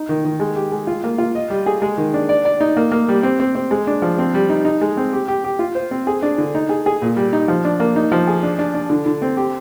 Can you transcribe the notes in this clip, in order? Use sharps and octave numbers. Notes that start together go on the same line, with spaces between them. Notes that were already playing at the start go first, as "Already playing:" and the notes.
Already playing: D#4
D#3
D#3
G#3
G4
G#3
F4
A#3
F4
D#5
G3
G#4
G#3
D#3
D4
D5
D5
D#4
A#3
A#3
G3
C4
C4
C4
G#3
D4
F3
C4
G3
D#4
D#4
G#3
C4
G4
G4
G4
F4
C5
C4
G#4
D4
D3
D#4
G#4
G#4
A#2
G3
D#4
F3
D4
A#3
D#4
F3
G#4
D4
D4
D4
D3
D3
C4
G4